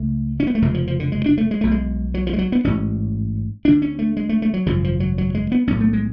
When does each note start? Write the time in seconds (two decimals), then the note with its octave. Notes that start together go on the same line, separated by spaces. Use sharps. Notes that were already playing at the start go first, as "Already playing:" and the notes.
Already playing: C#2 C#3 A3
0.40 C#4
0.47 B3
0.55 A3
0.62 F1 F2 C#3 G#3
0.74 F3
0.87 F3
1.00 D3
1.12 G#3
1.26 D4
1.38 A3
1.51 G#3
1.61 B1 B2 A3
1.71 G#3
2.14 F#3
2.27 F3
2.33 G#3
2.38 F#3
2.52 B3
2.64 A1 G#2 C#4
3.65 D2 D3 D4
3.82 C#4
3.99 A3
4.17 G#3
4.29 A3
4.42 A3
4.54 F#3
4.66 G#1 F#2 C#3 F3
4.84 F3
5.00 F#3
5.18 F#3
5.35 G#3
5.52 B3
5.67 B1 A2 C#4
5.81 A3
5.93 G#3